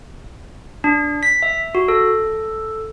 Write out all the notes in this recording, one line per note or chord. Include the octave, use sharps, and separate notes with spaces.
D4
B6
E5
F#4
A4